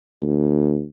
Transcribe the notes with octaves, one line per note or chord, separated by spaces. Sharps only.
D2